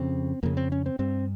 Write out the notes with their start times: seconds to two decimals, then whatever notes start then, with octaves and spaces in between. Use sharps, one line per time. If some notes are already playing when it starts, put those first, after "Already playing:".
Already playing: F2 C#3 C4
0.43 F2 C#3 A#3
0.57 C4
0.72 C#4
0.86 C4
0.99 G2 C4